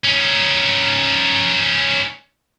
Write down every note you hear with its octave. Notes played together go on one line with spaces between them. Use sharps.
C#4 D#4